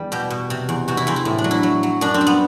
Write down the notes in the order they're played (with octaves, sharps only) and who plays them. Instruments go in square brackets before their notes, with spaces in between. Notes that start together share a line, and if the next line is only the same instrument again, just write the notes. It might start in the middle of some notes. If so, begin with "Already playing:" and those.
Already playing: [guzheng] E2 G3
B2 G4
B2
C3
E2
C3 F#4
E4
E2 C4
E4
A2
D4
F#3
E4
F#3
F#3
F#2 D4
C4
G3
B3